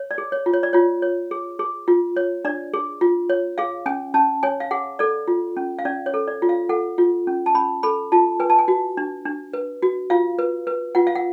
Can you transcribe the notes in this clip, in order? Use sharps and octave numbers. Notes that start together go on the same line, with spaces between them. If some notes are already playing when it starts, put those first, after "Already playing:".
Already playing: C#5
D5
G#4
C#5
F4
C#5
D5
F4 C#5
C#5
G#4
G#4
F4
C#5
D4 D5
G#4
F4
C#5
G#4 F5
C#4 G#5
C#4 A5
C#5 G#5
F5
G#4 F#5
A4 D5
F4
C#4
F5
C#4 D5
C#5
A4
D5
F4
F5
A4 F#5
F4
C#4
A5
C#4 B5
A4 B5
F4 A5
B4 G#5
A5
G#5
F#4
D4
D4
B4
F#4
F4 F5
B4
B4
F4 F#5
F5
F#5